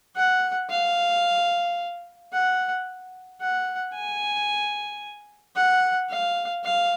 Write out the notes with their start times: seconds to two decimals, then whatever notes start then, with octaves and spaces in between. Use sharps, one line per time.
0.16 F#5
0.70 F5
2.33 F#5
3.41 F#5
3.94 G#5
5.56 F#5
6.10 F5
6.64 F5